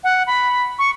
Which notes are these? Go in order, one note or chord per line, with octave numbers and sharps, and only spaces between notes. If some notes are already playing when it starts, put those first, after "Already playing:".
F#5
B5
C#6